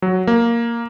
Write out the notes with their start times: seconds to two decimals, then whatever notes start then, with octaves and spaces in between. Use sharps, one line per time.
0.02 F#3
0.27 A#3